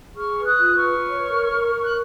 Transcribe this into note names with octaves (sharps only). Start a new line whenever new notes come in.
G#4 C#6 F6
B4
D#6 F#6
F4
C#6 F6
B4
C#5
A#4
A#4
A#4
F#6